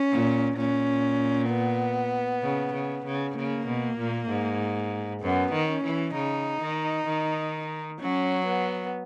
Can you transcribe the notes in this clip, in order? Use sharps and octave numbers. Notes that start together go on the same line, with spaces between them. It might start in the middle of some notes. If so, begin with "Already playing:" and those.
Already playing: C#4
A#2
A#2 C#4
B3
C#3
C#3
C#3
C#3 A#3
B2
A#2
G#2
F#2 B3
D#3
C#4
E3
C#3 D#4
D#3
D#3
F#3 C#4
B3